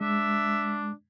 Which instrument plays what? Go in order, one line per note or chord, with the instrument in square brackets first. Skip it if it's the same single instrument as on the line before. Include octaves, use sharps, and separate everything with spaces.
[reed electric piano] G#3 [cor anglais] D4 [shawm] E5